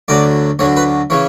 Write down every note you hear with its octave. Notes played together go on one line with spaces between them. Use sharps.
D2 D3 F#3 D5
D2 D3 F#3 C#5
B4
C#3 E3 C#5